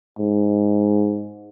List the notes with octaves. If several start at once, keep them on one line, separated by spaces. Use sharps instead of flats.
G#2